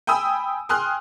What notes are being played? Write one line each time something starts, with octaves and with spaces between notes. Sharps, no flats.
G5 G#5 B5 D#6 E6
G5 G#5 C6 D#6 F6 F#6